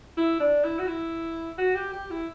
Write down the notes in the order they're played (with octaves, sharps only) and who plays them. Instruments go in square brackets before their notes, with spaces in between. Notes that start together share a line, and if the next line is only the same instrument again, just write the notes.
[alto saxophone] E4
D4
E4
F#4
E4
F#4
G4
G4
E4